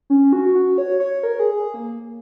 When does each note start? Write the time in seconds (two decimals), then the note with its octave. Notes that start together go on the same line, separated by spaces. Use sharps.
0.10 C#4
0.33 F#4
0.55 F#4
0.78 C#5
1.00 C#5
1.23 A#4
1.39 G#4
1.57 G#4
1.74 A#3